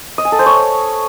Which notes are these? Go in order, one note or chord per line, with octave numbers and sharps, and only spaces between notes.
D#5
G#5
A4
C5
C#5